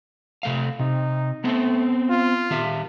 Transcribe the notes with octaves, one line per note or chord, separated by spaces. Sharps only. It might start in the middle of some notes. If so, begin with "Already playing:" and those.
C3 A3 F5
C3 D#4
A3 B3 C4
F4
D#3 G4 E5